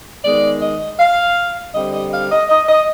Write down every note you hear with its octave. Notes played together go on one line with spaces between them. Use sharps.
D#3 G#3 B3 D5
D#5
F5
D3 G3 C4 D#5
D#5
F5
D#5
D#5
D#5